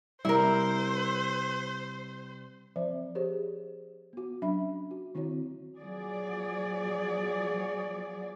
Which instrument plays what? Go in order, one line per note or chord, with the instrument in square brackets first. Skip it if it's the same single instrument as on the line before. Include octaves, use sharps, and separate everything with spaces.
[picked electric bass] C3 G3 [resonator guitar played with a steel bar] E4 A#4 [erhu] C5
[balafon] F3 C4 C5 D5 E5
G4 G#4 C5 C#5
B3 F#4
F#3 C#4 D4 E5 B5
F#4
D#3 C4 E4 F#4 C#5
[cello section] F3 F#3 G#4 D5